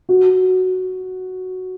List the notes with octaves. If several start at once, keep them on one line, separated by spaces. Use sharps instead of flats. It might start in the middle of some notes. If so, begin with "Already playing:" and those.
F#4